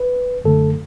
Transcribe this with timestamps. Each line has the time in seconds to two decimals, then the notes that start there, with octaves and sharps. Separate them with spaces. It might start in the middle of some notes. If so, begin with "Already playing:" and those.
Already playing: B4
0.44 F#2 D3 A3 A4